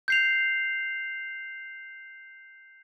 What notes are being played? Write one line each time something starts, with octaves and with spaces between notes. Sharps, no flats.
G6 C7 F7